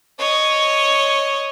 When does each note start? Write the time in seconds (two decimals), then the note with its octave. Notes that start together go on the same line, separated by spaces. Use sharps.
0.20 C#5 D#5